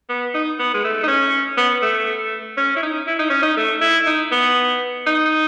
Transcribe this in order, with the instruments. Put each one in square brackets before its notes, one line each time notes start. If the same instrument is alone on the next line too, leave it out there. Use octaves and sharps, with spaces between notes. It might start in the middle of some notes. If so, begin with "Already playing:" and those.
[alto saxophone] B3
D#4
B3
G#3
A3
D#4
C#4
B3
A3
C#4
E4
D#4
E4
D#4
C#4
D#4
A3
E4
D#4
B3
D#4